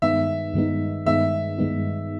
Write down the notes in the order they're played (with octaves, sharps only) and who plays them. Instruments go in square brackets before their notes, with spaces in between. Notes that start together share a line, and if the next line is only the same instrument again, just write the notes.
[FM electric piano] G2 D#3 G#3 B3 D#4 [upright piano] E5
[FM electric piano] G2 D#3 G#3 B3 D#4
[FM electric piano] G2 D#3 G#3 B3 D#4 [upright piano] E5
[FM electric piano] G2 D#3 G#3 B3 D#4